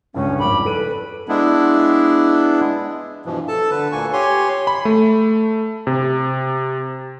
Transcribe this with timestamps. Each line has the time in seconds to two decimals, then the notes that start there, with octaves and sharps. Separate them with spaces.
0.14 C#2 G2 C#4
0.39 G#1 F2 B5 D6
0.65 A4 B4 D7 D#7
1.28 G#3 B3 D4 E4
3.26 G2 B2 E3 F3
3.48 A4 A5
3.71 D3 B4
3.92 D2 A#2 A#3 G#5 C#6
4.13 G4 C#5 G#5 C6
4.67 B5
4.85 A3
5.87 C3